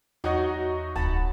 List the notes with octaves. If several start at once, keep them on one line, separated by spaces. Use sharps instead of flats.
E2 F#3 D#4 F#4 D#5 F#5
D1 F#5 A5 B5